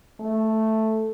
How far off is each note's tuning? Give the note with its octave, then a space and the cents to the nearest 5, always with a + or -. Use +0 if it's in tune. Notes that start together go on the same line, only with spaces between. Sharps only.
A3 +0